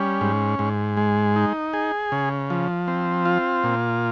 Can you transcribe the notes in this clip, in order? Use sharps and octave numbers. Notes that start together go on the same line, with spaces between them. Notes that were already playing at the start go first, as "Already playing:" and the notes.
Already playing: G3 C#4
G#2
G#2
G#3
D#4
G#4
C#3
F3
C4
F4
A#2